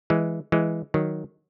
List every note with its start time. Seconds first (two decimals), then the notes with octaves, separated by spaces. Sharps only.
0.10 E3 G#3
0.52 E3 G#3
0.94 D#3 F#3